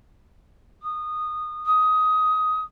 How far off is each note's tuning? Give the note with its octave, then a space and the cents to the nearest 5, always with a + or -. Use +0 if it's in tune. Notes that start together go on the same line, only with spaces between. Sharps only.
D#6 -20
D#6 +15